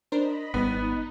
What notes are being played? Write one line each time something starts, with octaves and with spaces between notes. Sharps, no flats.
D4 A#4 C5 D#5 B5
G#1 G3 B3 D#4